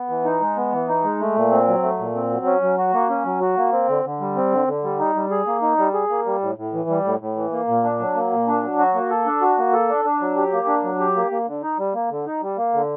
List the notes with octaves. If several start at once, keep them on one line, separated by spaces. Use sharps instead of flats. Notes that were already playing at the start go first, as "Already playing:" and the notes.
Already playing: B3
E3
D#4
G#3
B3
E3
D#4
G#3
A3
A#2
C4
F#3
A3
A#2
C4
F#3
C#4
F#3
F#4
A#3
C#4
F#3
F#4
A#3
C4
D3
D3
G3
C4
D3
D3
G3
D#4
G3
G#4
A#3
D#4
G3
G#4
A#3
G3
A2
A2
E3
G3
A2
A2
E3
A#3
A#2
D4
F#3
A#3
A#2
D4
F#3
F#4
A#3
A4
D4
F#4
A#3
A4
D4
D4
F#3
G4
A#3
D4
F#3
G4
A#3
A#3
D3
D#4
G3
A#3
D3
D#4
G3
A#3
D3